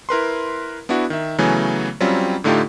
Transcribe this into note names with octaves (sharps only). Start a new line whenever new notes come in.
E4 A#4 B4 C6
B3 D4 E4 F#4
D#3 E5
C#3 E3 F#3 A3 B3 G#5
F#3 G3 C4 C#4 F4
A2 D3 A3 D#4 F4 G4